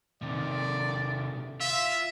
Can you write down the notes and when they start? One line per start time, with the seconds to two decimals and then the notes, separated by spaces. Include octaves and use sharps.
0.22 C3 D#3 D5
1.61 F4 E5